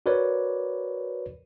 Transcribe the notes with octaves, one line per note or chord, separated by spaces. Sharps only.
F#4 A#4 B4 C#5 D5